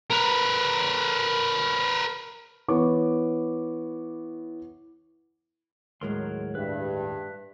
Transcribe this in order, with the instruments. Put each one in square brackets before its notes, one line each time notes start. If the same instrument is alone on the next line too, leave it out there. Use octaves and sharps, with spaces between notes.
[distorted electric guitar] A#4 B4
[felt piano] E3 B3 C#5 C#6 D6
[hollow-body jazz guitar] D#2 A2 G#3 [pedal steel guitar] F#3 A#4 C6
[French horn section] G2 [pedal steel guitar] B4 E5